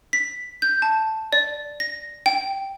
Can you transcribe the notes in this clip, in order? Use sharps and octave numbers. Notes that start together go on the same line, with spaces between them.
B6
G6
A5
D5
A#6
G5